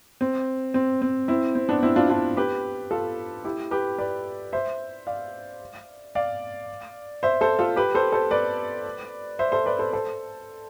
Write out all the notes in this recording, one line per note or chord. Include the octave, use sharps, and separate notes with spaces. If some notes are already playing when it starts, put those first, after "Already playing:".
C4
C4
C4
C4 E4
C4
B3 D4
C4 E4
D4 F4
D4 F4
G4 B4
F4 A4
E4 G4
G4 B4
B4 D5
C5 E5
D5 F5
D5 F5
C5 E5
A4 C5
F4 A4
G4 B4
A4 C5
A4 C5
B4 D5
C5 E5
A4 C5
B4 D5
A4 C5
A4 C5